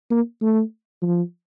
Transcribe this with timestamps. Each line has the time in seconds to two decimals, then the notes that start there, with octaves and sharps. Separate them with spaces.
0.11 A#3
0.42 A3
1.02 F3